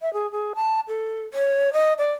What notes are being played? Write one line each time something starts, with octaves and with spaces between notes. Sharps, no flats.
E5
G#4
G#4
A5
A4
C#5
D#5
D5